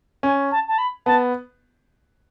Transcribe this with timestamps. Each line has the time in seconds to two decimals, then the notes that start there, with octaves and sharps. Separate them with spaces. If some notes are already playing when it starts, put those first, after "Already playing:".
0.23 C#4 G#5
0.51 A5
0.68 A5
0.78 B5
1.06 B3 A5